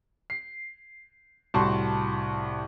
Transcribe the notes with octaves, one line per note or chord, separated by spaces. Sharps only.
C7
C2 A2 F#4 A5 C6 C#6